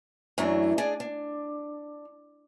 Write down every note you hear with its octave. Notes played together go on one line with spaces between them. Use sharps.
F#2 E3 F#3 A3 D4
D4 G#4 D5 D#5
D4